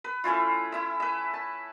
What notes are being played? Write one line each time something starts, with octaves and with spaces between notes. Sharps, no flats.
B4
A3 C#4 E4 F4
E4 E5
B4 E5
A5